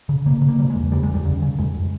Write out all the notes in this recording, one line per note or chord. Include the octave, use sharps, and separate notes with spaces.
C#3
C#3 A#3
C#3
A#3
C#3 G3
G#3
E2
C#3 G3
G#3
E2
G3
C#3
C#3
F2 G#3